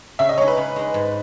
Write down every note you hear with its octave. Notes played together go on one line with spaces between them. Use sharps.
C#3 E5
D#5
G#3 D#4 C#5
B4
C#3
G#3 D#4
G#2